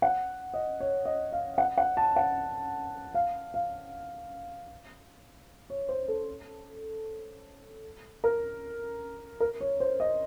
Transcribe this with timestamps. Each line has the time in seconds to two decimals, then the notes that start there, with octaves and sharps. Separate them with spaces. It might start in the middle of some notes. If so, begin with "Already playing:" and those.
0.02 F#5
0.54 D#5
0.80 C#5
1.05 D#5
1.33 F5
1.58 F#5
1.78 F#5
1.97 A5
2.16 F#5
3.15 F5
3.54 F5
5.70 C#5
5.89 C5
6.08 A4
8.24 A#4
9.40 A#4
9.61 C#5
9.80 C5
10.00 D#5